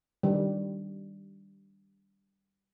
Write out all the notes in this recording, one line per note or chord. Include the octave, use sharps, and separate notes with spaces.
D#3 G3